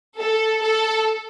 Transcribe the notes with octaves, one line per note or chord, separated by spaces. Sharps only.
A4
A4